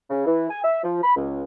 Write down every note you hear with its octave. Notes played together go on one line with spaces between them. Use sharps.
C#3
E3
G#5
E5
F3
B5
C#2